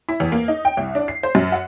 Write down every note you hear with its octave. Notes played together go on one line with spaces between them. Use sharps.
E4
E2
A#3
D#4
G5
C2
D4
C7
C5
F#2
F#5